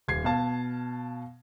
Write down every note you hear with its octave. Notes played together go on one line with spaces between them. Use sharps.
D#1 G#6 C7
B2 F5 A5